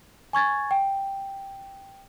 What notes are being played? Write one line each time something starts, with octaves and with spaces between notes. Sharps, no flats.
G#5 C#6 G#6 A6
G5